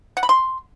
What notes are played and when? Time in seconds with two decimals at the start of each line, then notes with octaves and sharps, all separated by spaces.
0.17 F#5
0.23 B5
0.29 C6